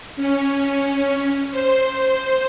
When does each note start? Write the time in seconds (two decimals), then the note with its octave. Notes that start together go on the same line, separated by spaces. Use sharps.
0.16 C#4
1.51 C5